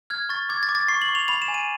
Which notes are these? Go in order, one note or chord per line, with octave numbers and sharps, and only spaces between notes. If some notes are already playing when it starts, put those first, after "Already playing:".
F6 G#6
C#6 A6
D6 G#6
A6
D6
A6
C#6 C7
F#7
C#6
F7
B5 F7
E7
G#5
D#7